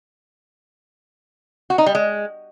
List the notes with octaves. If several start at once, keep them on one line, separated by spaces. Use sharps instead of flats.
F#4
D#4
G3
G#3